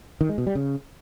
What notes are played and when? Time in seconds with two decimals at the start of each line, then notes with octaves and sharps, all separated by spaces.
0.21 D#3
0.29 G#3
0.38 B2
0.47 G3
0.55 C#3